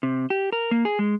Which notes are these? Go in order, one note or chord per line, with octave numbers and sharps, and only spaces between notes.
C3
G4
A#4
A#3
G#4
G#3